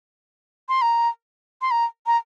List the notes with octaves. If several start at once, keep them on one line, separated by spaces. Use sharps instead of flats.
C6
A#5
C6
A#5
A#5